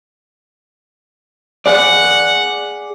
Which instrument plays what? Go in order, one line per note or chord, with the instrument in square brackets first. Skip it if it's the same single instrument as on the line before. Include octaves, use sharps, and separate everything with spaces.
[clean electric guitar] G#4 D5 [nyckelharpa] F#5